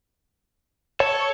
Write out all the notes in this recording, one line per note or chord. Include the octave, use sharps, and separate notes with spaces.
A4 C#5